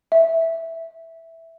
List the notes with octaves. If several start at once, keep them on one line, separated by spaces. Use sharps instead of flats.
E5